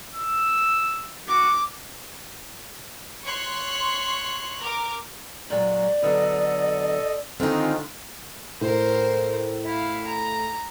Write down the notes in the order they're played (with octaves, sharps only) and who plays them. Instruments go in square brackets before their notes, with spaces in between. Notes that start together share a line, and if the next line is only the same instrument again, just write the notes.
[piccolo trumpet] E6
[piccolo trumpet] F#4 [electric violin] D6
[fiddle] C#5 F#6 [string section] C6 C#6
[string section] A#4 D6
[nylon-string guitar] A#2 G#3 [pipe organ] F#3 [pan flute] D5
[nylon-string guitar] B2 D3 F#3 [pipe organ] A4 D#5
[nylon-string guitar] D3 [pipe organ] D#3 G#3 F4 [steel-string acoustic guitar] C4 D#4
[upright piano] A2 [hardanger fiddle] A#4 C5
[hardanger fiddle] E4 F5
A#5